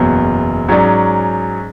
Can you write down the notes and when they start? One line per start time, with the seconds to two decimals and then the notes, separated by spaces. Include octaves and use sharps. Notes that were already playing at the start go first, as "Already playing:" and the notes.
Already playing: F#1 E2 B2 F#3
0.68 G#2 F#3 C#4 G#4 D5